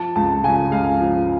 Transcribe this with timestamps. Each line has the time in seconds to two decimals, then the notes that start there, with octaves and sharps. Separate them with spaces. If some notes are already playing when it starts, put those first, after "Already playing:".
Already playing: F3 A5
0.16 C#2 A5
0.44 C#3 G#5
0.72 C#2 F5
1.00 F3